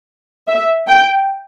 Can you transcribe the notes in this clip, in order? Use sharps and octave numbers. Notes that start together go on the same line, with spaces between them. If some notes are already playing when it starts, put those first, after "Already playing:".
E5
G5